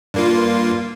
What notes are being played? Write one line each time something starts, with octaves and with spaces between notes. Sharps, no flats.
G2 A#3 F4